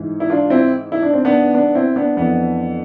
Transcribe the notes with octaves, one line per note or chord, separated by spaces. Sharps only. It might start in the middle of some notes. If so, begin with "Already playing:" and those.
Already playing: G#2 E3
E4
D4 F4
C4 E4
E4
D4
C4
B3 D4
B3 D4
C4 E4
B3 D4
F2 E3 B3 D4